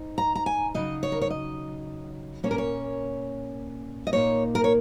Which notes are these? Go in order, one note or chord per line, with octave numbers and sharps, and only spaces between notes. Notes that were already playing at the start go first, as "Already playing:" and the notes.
Already playing: G#2 D#4
A#5
A#5
G#5
C#3 F#3 D#4 D#5
C#5
A#4
C#5
D#5
A#2 A#3 C#4 C#5
A#4
C#5
D#5
A#2 A#3 D#4 C#5
A#4
C#5